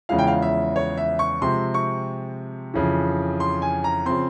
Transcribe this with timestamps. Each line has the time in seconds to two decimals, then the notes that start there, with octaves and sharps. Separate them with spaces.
0.09 E2 C#3 F3 G#3 E4 F5
0.19 G5
0.27 F5
0.42 E5
0.76 C#5
0.98 E5
1.19 C#6
1.42 C3 F3 G#3 C4 C6
1.74 C#6
2.74 F2 C#3 E3
3.40 C6
3.62 G#5
3.84 A#5
4.06 C#3 F3 C4 C6